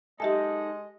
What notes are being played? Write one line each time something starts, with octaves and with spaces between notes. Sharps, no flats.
G#3 D#4 G4 A4 D#5 E5 G#5